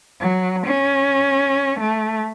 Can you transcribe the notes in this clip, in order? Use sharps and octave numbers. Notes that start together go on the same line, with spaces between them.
F#3
C#4
A3